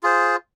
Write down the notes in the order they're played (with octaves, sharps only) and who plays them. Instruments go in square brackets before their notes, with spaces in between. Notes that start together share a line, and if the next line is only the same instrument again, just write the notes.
[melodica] F4 G#4 C5